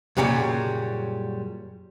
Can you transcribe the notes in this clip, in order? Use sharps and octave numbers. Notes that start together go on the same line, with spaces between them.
F#2 A#2 C#3 F#3 G3